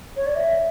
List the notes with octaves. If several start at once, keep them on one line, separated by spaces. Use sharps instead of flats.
C#5
D5
E5